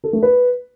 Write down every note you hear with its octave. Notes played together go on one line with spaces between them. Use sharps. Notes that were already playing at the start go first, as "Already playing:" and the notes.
A4
A3
B4